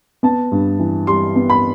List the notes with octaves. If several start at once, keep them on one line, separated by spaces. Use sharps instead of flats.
B3 A5
G2
E3
G3 C6
B3
B5